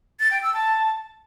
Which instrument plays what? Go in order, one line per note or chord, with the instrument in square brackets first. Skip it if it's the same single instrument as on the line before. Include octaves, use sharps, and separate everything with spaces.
[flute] A6
G5
E6
A5